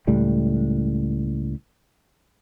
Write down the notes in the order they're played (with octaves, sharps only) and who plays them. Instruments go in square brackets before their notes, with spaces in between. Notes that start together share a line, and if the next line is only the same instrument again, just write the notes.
[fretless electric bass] C#2 A2 G3 A3